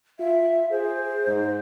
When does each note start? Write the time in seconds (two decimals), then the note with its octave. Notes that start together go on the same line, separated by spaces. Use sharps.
0.19 F4 E5
0.71 G#4 C5
1.27 G#2